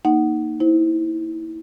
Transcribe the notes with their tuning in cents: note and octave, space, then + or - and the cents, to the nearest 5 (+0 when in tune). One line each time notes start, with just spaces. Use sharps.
A#3 +0 D#4 +0 F#5 +10
E4 -20 C5 +0